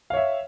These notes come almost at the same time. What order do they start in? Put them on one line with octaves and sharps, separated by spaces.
F5 C#5 E5